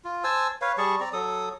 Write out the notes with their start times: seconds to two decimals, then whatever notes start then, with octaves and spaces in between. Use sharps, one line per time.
0.05 F4
0.24 C5 G#5 A5 E6
0.61 B4 C#5 F5
0.78 G3 G#4 A5 C#6
1.00 C4 D5 A#5
1.13 F#3 A4 D#6